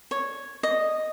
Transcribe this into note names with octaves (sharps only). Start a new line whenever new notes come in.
C#5
D#5